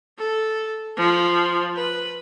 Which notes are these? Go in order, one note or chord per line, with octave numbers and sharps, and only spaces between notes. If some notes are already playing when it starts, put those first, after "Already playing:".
A4
F3
B4